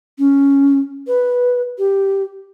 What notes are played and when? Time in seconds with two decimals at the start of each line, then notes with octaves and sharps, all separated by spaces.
0.19 C#4
1.07 B4
1.78 G4